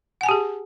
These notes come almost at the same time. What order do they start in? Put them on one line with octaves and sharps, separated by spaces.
F#5 G#5 A5 G4 G#4